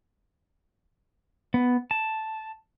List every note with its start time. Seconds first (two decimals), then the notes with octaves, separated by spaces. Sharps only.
1.54 B3
1.91 A5